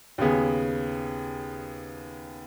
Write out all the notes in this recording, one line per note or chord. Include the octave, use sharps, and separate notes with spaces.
D#2 C#3 B3 G#4